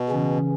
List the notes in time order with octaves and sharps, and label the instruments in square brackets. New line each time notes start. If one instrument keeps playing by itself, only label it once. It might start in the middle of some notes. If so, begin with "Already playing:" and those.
Already playing: [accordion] B2
[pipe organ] C#3 E3 C#4